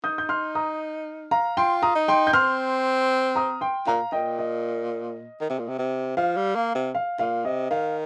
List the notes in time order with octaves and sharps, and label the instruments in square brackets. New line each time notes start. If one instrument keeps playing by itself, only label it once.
[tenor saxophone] D#4 [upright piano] D#6 G6
[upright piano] G6
C6 F6
A#5 D#6
F5 A#5
[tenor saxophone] F4 [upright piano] G5 C6
[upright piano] A#5 D#6
[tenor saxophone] D#4
[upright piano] G5 C6
G6
[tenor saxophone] C4 [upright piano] C6 F6
[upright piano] A#5 D#6
G5 C6
[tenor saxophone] A#2 [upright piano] F5 A#5
[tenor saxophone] A#2 [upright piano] D#5 G5
[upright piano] D#5
[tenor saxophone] D#3
C3
A#2
C3
C3
[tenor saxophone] F3 [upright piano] F5
[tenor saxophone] G3
A#3
C3
[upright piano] F5
[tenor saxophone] A#2 [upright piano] F5
[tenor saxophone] C3 [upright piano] D#5
[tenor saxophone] D#3 [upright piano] F5